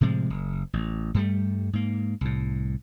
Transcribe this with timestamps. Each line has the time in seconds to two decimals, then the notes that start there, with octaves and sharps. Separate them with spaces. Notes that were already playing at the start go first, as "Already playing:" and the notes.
0.01 A2 C3 F3 G#3
0.30 F#1
0.73 A1
1.14 G2 G3 A3
1.73 G#2 A#3
2.21 C2 A2